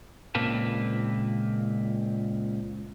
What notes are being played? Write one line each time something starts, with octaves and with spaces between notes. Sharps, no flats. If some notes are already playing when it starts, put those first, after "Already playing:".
C#2 A#2 A#3 C4 B4 A5